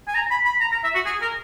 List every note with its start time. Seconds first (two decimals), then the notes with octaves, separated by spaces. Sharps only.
0.08 G#5
0.15 A#5
0.31 B5
0.45 B5
0.61 A#5
0.72 A#5
0.84 E5
0.94 F#4
1.06 G#4
1.22 A#4